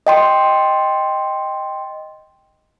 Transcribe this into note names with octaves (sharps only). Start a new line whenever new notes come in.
D#5 G5 C6